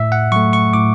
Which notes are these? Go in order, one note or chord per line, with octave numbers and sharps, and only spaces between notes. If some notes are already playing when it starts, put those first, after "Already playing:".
Already playing: A2 E5
F#5
F#3 A3 C#6
C#6
A2 D6